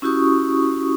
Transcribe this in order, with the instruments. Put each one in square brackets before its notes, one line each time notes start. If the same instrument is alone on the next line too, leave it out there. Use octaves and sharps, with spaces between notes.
[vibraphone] C#4 E4 F#4 G4 C#6 D#6